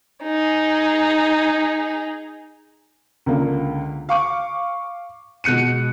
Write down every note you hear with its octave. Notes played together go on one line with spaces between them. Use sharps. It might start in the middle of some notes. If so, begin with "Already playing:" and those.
D#4 G#4
C#2 D3 A#3
F5 C#6 D6
B2 G#3 F#6 C#7 D#7